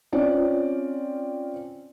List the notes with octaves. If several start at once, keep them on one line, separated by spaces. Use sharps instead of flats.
C4 C#4 F4 D5